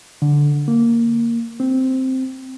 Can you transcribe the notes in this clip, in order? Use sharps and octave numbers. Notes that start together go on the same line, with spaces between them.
D3
A#3
C4